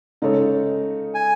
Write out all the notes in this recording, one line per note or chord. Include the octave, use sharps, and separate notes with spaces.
C#3 G#3 D#4 A4 C#5
G#5